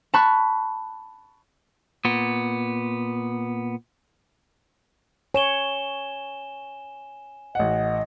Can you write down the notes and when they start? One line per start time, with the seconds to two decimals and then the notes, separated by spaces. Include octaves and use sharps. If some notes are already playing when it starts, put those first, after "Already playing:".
0.14 A5 B5 C#6 F#6
2.05 A#2 B3
5.34 C#5 G#5 E7 G7
7.55 A1 D#5 F#5